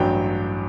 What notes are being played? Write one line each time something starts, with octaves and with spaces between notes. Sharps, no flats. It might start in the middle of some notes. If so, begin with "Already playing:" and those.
Already playing: A1 G2 F#3 G5